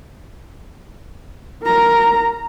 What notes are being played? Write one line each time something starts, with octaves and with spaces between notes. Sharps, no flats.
A#4 A#5